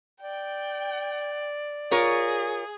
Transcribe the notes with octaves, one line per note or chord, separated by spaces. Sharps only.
D5 G5
F4 G#4 A#4 C#5